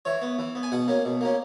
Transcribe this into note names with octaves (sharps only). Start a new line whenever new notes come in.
E3 C#5
B3
E3
B3
G#5
B2 F#5
A#3 C#4
B2
A#3 C#4